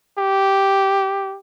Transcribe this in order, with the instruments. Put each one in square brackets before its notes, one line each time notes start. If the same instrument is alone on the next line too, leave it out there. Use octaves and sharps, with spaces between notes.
[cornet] G4